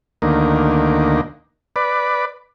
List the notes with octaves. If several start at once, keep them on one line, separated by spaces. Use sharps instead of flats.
D2 D#3 A#3
B4 D5